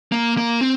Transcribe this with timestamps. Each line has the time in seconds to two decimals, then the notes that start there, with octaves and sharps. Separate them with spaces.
0.12 A#3
0.37 A#3
0.61 C4